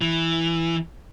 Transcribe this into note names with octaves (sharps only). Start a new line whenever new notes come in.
E3